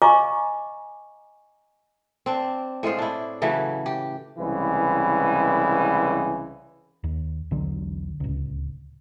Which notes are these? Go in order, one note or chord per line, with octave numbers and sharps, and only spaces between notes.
D#5 F5 G#5 A#5 C#6 D6
C4 D4
A2 G#3 F4 C5
D4 E4
C#3 E3 F#3 A3
G4
C2 C#3 E3 G#3 B4
D#2
B1 E2 D3 F#3
D1 C#2